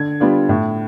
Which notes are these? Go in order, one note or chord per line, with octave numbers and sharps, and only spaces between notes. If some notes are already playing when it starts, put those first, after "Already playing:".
Already playing: D3 G#6
G3 B3 D4 F4
A2